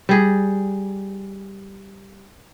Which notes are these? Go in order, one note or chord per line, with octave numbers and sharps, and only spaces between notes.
G3 G#4